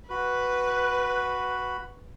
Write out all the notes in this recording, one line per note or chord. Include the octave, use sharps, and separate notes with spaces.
F#4 B4 B5